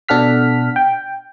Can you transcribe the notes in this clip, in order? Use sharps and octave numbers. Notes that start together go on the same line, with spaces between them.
B2 D4 A4 F#5 F6 B6
G5